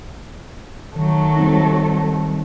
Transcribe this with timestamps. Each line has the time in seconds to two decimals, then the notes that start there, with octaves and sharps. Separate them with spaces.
0.96 D#3 F#3 A3
1.37 G3 C4 D#4